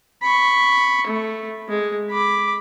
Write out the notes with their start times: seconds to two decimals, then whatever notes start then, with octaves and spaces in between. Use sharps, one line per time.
0.22 B5 C#6
1.06 A3
1.68 G#3
2.10 B5 D6